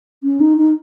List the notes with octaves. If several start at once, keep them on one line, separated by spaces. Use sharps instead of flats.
C#4
D#4
D#4